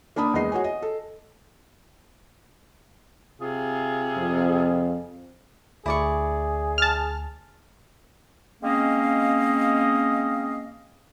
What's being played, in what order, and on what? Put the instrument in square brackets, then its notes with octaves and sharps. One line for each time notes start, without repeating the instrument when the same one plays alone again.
[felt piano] A#3 D4 A5 B5 D#6
E2 G#3 D#5 C7
F#4 G#4 C#5 G#5
D#5
A4
[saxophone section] C3 F4 G#4
[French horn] F2
[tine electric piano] D2 [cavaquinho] E4 D5 C#6 [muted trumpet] G#4
[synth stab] A5 F6
[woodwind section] G#3 A#3 C4 C#4 D#5 F5